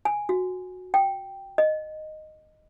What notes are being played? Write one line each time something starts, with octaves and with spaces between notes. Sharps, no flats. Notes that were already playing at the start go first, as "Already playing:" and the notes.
G#5
F#4
G5
D#5